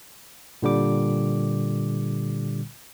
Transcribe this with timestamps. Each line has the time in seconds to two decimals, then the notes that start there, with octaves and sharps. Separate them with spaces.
0.62 A#2 D3 G3 D6